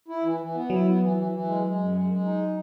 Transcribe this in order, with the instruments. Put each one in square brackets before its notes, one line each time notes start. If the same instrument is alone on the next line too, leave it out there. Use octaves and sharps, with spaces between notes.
[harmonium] E4
E3
E3
B3
[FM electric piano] F#3 [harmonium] E4
[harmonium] B3
E3
E3
E3
G#3
G#3
F#2
G#3
G#3
D#4